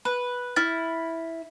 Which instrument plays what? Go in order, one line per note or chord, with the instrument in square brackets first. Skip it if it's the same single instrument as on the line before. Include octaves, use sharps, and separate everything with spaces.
[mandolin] B4 [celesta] B5
[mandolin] E4 [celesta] F6 A6